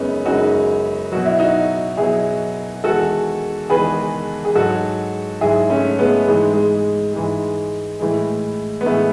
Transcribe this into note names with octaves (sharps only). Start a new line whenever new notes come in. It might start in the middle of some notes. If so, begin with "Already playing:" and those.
Already playing: F#2 C#3 G#3 B3 C#4 D#4
F#2 C#3 G#3 D#4 F#4
B2 F#3 F#4
E4
D#4 F#4
B2 F#3 E4 G#4
E2 D#3 G#3 F#4 A4
E2 D#3 G#3 G#4 B4
G#4
G#2 F#3 F#4 A4
G#2 F#3 E4 G#4
A3 C#4
G#3 B3
G#2 E3 G#3
G#3
G#2 E3 G#3
A2 E3 G#3
B3
A2 E3 G#3 A3